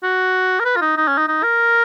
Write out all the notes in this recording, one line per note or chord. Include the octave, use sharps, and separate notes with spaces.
F#4
A#4
B4
F4
D#4
D#4
C#4
D#4
D#4
A#4